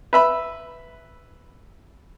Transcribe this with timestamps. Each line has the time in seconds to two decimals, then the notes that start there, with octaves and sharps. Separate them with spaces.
0.13 B4 E5 B5